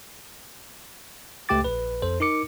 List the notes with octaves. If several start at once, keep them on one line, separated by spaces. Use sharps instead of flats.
C#2 A3 G4 G5 D6 A6
A#1 B4
F2 A4 C5
D#4 A#4 D6 C#7